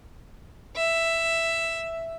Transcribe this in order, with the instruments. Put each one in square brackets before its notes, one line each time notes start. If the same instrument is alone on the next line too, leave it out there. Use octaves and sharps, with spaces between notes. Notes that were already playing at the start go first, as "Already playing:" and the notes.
[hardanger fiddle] E5